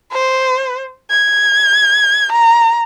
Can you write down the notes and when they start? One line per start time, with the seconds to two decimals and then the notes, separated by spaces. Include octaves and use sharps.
0.12 C5
1.10 G#6
2.33 A#5